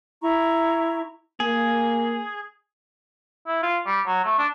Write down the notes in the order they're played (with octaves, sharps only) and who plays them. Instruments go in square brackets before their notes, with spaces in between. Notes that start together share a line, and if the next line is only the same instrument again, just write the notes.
[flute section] E4 A#5 C#6
[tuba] A#3 [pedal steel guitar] G#4
[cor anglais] E4
F4
G3
F#3
A3
D4